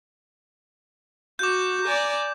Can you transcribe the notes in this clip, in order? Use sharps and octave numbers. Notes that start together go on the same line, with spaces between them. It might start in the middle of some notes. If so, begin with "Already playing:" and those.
F#4 D6 G6
D5 G#5 A#5